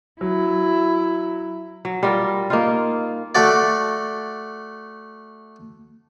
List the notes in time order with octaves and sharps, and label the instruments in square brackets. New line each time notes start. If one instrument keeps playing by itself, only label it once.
[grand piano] F#3 [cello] E4
[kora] F#3
G3 F4 A#4
A#3 D#4 F4
[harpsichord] A3 F#4 D5